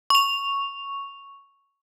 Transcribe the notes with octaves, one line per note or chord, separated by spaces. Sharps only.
C#6 F7